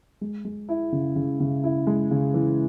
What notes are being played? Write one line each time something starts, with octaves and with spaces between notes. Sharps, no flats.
G#3
G#3
E4
C#3
C#3
C#3
E4
G#3
C#3
E3